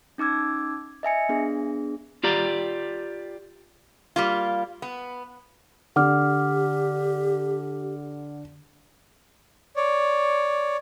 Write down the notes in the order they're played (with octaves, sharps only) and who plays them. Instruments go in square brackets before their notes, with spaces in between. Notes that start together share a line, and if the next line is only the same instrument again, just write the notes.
[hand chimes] C#4 D#4 D6 E6 G#6
D#5 E5 G#5 C#7
B3 D4 G#4
[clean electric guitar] F4 G4 D5 A#5
[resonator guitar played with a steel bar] G3 A#3 F4
B3
[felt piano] D3 [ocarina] G4 [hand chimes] F#5 D6 F6
[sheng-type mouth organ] C#5 D5